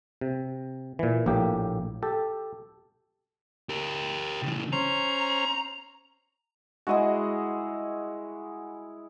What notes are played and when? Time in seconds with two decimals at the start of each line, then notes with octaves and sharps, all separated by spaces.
0.21 C3
0.99 A#2 E3
1.26 A#1 A2 A#3 G4
2.03 G4 A4
3.69 G4 A#4
4.43 C#3 E3
4.73 C#4 C5 A#5
6.87 G#3 E4 F#4 G#4 D#5